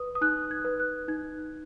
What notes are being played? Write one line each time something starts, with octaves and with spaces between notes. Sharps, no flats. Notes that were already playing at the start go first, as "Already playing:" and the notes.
Already playing: B4 D#6
D#6
D#4 F#6
G#6
B4
F#6
D#4 G#6